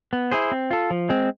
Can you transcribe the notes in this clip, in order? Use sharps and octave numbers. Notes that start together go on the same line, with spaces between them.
B3
E4 G#4 C5
C4
F4 A4
F3
G#3 C4